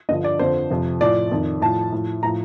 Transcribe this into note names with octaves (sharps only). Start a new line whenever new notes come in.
G2 D3 F3 D#5
D5
F2 D3 F3 C5
F2 C3 F3
A2 F3 D5
F2 D#3
A2 F3 A5
A2 F3
A2 F3 A#5